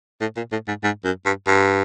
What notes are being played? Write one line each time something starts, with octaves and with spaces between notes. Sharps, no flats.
A2
A#2
A2
G#2
G#2
F#2
G2
G2